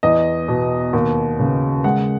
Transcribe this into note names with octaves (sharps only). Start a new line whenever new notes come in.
E2 D#5
B2
D#2
C#3
G#3 F#5